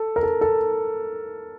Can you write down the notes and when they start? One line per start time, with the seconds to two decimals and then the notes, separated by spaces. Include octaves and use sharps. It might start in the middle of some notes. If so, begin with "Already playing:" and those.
Already playing: A4
0.16 A#4
0.23 A4
0.41 A4